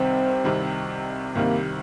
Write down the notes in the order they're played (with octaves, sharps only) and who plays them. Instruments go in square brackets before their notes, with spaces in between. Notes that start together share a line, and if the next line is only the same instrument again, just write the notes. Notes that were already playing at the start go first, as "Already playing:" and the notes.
Already playing: [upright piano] C2 C3 D#3 G3 [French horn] C4
[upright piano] C2 C3 D#3 G3
[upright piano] C2 C3 D#3 G3 [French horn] A#3